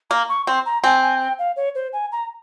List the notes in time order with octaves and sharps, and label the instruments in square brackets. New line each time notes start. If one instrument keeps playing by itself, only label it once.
[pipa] A#3 [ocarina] A#5
[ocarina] C#6
[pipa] C4 [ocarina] C6
[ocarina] A#5
[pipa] C4 [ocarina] G#5
[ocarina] G#5
G5
F5
C#5
C5
G#5
A#5